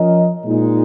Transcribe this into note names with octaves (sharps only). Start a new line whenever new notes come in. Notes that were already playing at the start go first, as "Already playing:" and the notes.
Already playing: F3 C#4 A#4 D#5
A#2 G#3 D#4